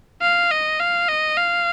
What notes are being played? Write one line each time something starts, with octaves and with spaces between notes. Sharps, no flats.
F5
D#5
F5
D#5
F5